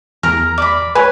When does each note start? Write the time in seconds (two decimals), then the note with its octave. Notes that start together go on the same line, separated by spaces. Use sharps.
0.23 E2 A#4 A#5 F6
0.58 D5 B5
0.95 B4 C#5 G#5